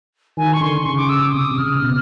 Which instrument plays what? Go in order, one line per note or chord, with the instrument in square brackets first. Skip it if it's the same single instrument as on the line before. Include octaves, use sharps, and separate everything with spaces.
[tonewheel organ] D#3 [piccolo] G#5
[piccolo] C#6
[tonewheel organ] D3 [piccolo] C6
[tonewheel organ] C#3 [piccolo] C#6
[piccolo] D6
E6
D6
[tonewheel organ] C3 [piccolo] D#6
[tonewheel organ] C#3 [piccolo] F6
[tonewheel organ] B2